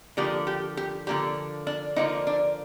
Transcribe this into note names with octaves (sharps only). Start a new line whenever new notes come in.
D3 F3 A#3 D4 G4
G4
G4
D3 F3 A#3 D4 G4
D4
D3 F3 A#3 D4 D#4
D4